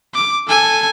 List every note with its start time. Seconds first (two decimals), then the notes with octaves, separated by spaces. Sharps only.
0.14 D6
0.47 A4 G#5